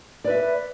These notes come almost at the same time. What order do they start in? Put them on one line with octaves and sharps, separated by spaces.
D5 B4 E5